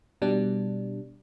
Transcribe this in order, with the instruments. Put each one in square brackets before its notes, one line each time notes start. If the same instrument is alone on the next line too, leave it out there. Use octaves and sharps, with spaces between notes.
[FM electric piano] B2 G3 D4